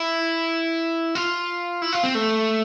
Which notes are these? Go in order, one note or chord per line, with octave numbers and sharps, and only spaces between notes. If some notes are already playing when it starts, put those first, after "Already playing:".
Already playing: E4
F4
E4
F4
C4
A3